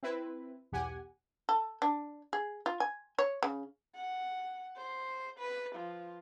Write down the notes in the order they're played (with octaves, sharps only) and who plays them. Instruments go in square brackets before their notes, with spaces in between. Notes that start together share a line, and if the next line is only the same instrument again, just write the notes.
[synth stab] C4 E4 B4
B1 E2 G4 F#5 G#5
[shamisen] A4
D4
G#4
F4
G#5
C#5
C#3
[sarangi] F#5
C5
B4
F3